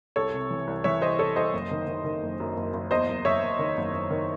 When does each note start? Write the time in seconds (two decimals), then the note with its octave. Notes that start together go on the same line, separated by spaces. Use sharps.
0.16 C2 A4 C#5
0.34 C3
0.51 E3
0.67 C2
0.84 E3 C#5 E5
1.02 C2 C5 D#5
1.19 C2 A4 C#5
1.36 C2 C5 D#5
1.53 F#1
1.71 D#3
1.88 D#3
2.05 D#3
2.23 F#1
2.40 F#2
2.57 F#1
2.73 F#1
2.91 E2 C5 D#5
3.08 F#1
3.25 F#1 C#5 E5
3.43 F#1
3.59 D#3
3.77 F#1
3.93 F#1
4.11 D#3